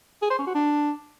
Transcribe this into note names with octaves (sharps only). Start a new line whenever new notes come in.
G#4
C5
C#4
F#4
D4